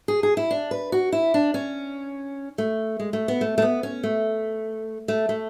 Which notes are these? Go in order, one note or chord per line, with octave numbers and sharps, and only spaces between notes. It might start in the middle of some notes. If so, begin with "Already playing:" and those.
G#4
G#4
E4
D4
B4
F#4
E4
D4
C#4
A3
G#3
A3
B3
A3
A3
B3
C#4
A3
A3
A3